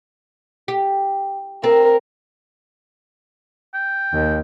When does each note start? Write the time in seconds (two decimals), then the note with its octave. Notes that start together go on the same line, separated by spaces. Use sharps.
0.68 G4
1.64 C4 A#4
3.74 G5
4.13 D#2